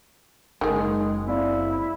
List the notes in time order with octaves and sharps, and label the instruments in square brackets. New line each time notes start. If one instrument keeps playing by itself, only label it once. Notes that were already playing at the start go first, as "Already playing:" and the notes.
[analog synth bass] F#1 [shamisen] D#3 G#4 [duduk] G#3
[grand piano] C4 D5 F5 [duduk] E4